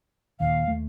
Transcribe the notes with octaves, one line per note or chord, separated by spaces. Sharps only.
D#1 D#2 F5
D#2 A3